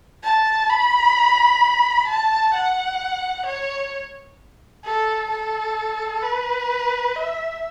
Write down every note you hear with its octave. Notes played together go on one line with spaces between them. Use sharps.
A5
B5
A5
F#5
C#5
A4
A4
B4
E5